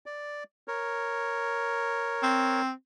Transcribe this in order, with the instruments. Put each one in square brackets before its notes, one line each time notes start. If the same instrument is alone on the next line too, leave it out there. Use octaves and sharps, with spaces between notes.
[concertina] D5
A#4 C#5
[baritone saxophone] C4